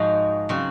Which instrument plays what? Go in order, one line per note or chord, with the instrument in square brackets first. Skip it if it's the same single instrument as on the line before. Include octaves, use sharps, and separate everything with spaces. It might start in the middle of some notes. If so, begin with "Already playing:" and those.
Already playing: [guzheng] G#2 F3 G#3 D#4 F#4
C#3 F#3 C4 F#4